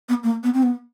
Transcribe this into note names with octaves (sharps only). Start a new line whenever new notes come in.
B3
A#3
B3
C4
B3